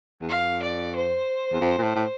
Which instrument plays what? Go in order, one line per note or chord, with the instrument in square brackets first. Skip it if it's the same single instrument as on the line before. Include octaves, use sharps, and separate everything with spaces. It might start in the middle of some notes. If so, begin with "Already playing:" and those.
[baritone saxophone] E2
[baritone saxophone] F2 [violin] F5
[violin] D5
C5
[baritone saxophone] E2
F2
A#2
A2
A2